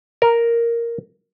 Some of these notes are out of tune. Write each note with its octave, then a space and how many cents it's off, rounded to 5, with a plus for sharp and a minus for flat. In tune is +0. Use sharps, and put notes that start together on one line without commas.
A#4 +0